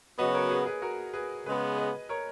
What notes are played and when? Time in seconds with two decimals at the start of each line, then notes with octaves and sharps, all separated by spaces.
0.18 C#3 F#3 B3 F#4 B4 D#5
0.34 A#4 C#5
0.51 G#4 B4
0.66 G#4 B4
0.82 F#4 A#4
1.14 G#4 B4
1.46 C#3 G#3 B3 G#4 B4
1.78 B4 D#5
2.09 A#4 C#5